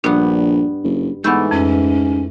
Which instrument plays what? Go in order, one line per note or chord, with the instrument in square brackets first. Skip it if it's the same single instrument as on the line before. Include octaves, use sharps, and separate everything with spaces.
[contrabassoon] A#1 [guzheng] G2 B3 [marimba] D4
[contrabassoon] F#1
[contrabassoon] G#2 [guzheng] E3 A3 [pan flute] B3 [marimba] F#5 B5 G6
[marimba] F2 [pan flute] C#4